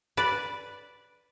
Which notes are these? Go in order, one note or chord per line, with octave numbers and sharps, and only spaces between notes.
B4 D5